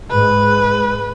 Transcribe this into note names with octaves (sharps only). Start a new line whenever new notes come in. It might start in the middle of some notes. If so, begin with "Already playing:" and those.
G#2 G#3 B4